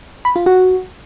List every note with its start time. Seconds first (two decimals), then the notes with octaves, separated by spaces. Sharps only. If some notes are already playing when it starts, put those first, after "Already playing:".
0.25 B5
0.36 F4
0.46 F#4